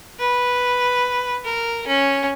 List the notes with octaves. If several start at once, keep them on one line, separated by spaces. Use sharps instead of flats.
B4
A#4
C#4